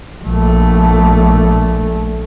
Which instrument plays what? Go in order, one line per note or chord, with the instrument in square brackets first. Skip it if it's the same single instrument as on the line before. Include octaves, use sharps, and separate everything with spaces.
[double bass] A#1 A3